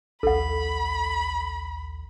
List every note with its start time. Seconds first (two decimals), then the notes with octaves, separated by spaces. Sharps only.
0.23 A#1 D#2 A4 F#5 B5